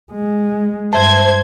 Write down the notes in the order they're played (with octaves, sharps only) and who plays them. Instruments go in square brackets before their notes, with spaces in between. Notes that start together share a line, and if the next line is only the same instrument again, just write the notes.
[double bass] G#3
[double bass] G2 [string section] C5 G#6 [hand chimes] E5 A5